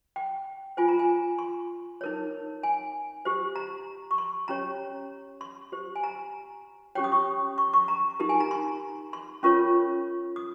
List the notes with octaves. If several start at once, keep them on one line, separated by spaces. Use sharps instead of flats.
G5
F4 C5 G#5
A#5
G#5
C6
D#4 A#4 C#5
G#5
G4 C5
A#5
C#6
C6
C#4 G4 C#5 A#5
C6
G4 C5
G#5
A#5
C#4 G4 C#5 G5
D#6
C#6
C#6
C#6
A#5
D#4 G4 A#4
G#5
A#5
C6
C6
C#4 F4 A#4 C#5 C#6
D#6